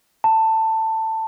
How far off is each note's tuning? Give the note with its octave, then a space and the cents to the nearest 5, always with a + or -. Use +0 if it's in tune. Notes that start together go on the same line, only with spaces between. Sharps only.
A5 +15